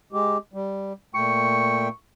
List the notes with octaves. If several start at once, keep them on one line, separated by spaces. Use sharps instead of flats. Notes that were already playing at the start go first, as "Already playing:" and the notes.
G#3 G4
G3
A#2 A3 G5 C#6